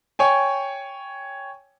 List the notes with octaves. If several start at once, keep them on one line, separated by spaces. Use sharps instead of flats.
C#5 G5 G#5